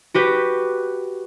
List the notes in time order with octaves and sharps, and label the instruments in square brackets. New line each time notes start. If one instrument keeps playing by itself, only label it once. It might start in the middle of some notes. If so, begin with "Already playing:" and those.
[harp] F#4 G4 B4